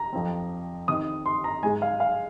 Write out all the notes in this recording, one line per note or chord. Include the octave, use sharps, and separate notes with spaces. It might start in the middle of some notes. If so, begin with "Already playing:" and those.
Already playing: A#5
F2 F3 C4
D#3 C4 D#4 D#6
C6
A#5
G#2 G#3 D#4 G#5
F5
F5